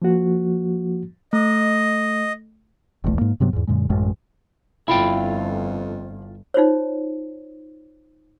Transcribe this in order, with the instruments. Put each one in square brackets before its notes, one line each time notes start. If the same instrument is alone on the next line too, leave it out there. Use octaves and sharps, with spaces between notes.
[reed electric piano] F3 A#3 F#4
[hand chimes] A3 [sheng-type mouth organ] D#5
[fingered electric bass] F1 B1 E2 A3
G#2 A#3
G2 C3 F#3 B3
E2 G#2
F#2 A#2 D3 G#3
A1 F#2 A2 G#3
[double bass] G1 [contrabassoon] F2 [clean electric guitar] E4 F4 G5 [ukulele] B5
[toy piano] D#4 F4 C5 C#5